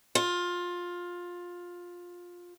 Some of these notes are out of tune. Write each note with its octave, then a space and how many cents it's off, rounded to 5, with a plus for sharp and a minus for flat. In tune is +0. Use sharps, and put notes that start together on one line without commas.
F4 +15